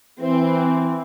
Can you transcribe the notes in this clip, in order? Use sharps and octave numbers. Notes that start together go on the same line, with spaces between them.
E3 C4